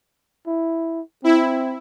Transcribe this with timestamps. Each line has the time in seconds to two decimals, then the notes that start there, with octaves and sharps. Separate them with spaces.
0.47 E4
1.24 C4 E4